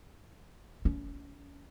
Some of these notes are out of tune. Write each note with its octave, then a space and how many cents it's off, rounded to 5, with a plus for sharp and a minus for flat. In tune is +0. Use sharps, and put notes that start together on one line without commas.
C#4 +35